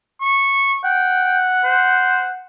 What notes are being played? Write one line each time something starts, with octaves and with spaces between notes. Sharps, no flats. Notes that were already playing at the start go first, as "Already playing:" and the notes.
C#6
F#5 G5
C5